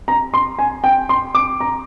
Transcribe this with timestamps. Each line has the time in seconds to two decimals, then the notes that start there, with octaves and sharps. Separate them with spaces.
0.08 A#5
0.34 C6
0.58 G#5
0.84 G5
1.09 C6
1.35 D6
1.60 A#5